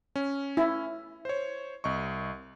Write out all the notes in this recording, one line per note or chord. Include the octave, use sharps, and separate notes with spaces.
C#4
E4
C5 C#5
C2 D#5 C#6